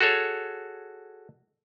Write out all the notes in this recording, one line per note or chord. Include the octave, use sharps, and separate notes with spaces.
F#4 G#4 A4 C#5